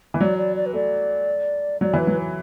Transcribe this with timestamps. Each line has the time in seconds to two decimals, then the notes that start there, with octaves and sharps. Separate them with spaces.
0.14 E3
0.20 F#3 D5
0.38 D5
0.56 D5
0.66 B4
0.73 A3 D5
1.81 F#3 D5
1.93 E3 B4
2.07 F#3